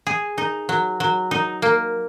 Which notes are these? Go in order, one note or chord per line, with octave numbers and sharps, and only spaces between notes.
G#4
D#4
F#3
F#3
D#4
A#3